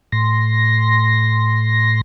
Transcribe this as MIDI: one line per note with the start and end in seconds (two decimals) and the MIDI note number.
0.12 2.01 45
0.12 2.01 84
0.12 2.01 94